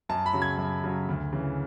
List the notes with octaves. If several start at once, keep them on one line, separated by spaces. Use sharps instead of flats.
F#2 A5
B5
C#3 F#3
G#6
F#2
C#3 F#3
D2
C#3 E3